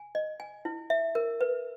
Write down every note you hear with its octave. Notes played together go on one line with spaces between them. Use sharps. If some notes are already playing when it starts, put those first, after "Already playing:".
Already playing: G#5
D#5
G#5
E4
E5
A#4
B4